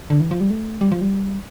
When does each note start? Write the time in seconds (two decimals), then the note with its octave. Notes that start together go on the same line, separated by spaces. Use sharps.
0.10 D3
0.20 E3
0.31 F3
0.41 G3
0.50 A3
0.81 G3
0.92 F3
1.01 G3